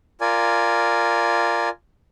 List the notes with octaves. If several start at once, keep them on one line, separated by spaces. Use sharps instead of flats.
F4 A#4 D5 G#5